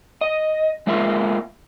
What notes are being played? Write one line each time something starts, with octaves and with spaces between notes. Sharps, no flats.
D#5
G#3 A#3 F4 E5